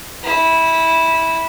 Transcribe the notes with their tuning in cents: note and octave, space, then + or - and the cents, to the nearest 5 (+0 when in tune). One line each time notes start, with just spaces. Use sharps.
E4 -15